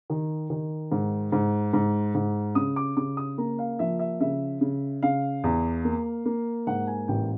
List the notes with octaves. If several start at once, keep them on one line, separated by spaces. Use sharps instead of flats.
D#3
D#3
G#2
G#2
G#2
G#2
C#3 D#6
D6
C#3 D6
D#6
A#3 A#5
F5
F3 E5
E5
C#3 E5
C#3
C#3 F5
E2
A#3
A#3
G#2 F#5
G#5
A1 G5